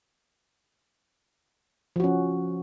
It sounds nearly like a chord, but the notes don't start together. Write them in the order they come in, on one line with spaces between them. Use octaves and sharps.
F3 F#4 C#4